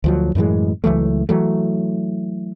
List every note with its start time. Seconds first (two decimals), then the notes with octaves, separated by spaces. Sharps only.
0.04 D2 F3 F#3
0.35 F#2 A2 E3 G#3
0.84 C#2 E3 F#3 A3
1.29 E3 F#3 A3